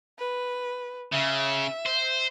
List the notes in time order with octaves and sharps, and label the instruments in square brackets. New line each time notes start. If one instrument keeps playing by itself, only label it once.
[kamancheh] B4
[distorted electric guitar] C#3 [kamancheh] E5
[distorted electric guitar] C5